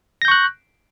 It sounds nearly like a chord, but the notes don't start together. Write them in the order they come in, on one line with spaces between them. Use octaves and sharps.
A#6 G6 C#6 F#6